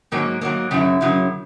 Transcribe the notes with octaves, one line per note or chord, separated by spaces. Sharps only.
G#2 F#3 A#3
G#2 F#3 A#3
F#2 C#3 F#3 E4
F#2 C#3 F#3 E4